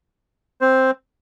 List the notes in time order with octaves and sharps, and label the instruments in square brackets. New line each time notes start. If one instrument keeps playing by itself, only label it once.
[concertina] C4 C5